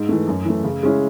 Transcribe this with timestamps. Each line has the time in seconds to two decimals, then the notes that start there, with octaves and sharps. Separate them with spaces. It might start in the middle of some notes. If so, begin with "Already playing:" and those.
Already playing: G#2
0.09 E3 A3
0.27 F#2
0.45 E3 A3
0.64 C#3
0.83 G#3 C#4 E4